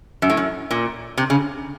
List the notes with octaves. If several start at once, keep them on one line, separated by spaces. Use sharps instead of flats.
F#2
A2
F#2
A#2
C3
C#3